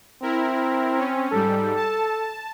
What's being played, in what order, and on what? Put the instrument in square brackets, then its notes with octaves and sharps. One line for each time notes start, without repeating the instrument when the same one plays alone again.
[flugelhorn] C4 [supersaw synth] E4 A#4
[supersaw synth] C#4
[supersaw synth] G#2 G3 [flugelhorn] A4
[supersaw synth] A5